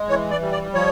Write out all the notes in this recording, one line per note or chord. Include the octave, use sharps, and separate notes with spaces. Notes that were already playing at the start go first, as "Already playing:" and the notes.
Already playing: G#3
E3 C#5
D5
G3
D5
F3 C#5